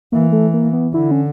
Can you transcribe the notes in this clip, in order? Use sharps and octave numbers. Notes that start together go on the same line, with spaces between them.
E3 A#3
A3
A#3
B3
D3 E4
C#4